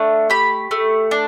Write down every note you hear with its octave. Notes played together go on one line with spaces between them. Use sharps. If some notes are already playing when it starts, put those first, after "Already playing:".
Already playing: A3 D4
G4 B5
A3
D4